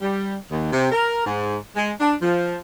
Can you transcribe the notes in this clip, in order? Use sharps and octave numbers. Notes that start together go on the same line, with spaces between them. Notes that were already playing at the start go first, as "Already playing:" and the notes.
G3
D#2
C3
A#4
G#2
G#3
D4
F3